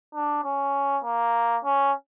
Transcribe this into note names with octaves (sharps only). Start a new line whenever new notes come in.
D4
C#4
A#3
C#4